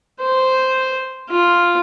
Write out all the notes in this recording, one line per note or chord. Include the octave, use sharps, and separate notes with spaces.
C5
F4